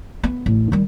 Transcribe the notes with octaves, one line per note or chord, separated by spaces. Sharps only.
B3
A1
D#3 G3